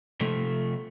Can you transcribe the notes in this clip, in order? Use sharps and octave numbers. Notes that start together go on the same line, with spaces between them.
C3 F3 A3